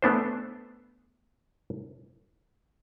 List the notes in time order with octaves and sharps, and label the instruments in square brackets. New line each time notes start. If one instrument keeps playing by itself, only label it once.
[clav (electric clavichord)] A3 B3 D4 C5